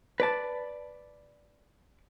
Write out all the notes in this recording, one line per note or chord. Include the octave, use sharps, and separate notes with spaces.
B4 D5 A5